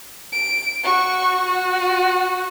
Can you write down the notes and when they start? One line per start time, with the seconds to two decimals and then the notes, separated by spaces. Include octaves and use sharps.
0.32 D7
0.83 F#4 C#6
1.46 F#4